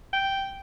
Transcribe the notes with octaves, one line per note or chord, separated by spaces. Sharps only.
G5